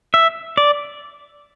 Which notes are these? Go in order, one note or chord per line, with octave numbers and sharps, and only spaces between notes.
E5
D5